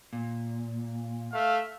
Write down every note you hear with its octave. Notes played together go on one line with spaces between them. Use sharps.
A#2
A3 E5 F5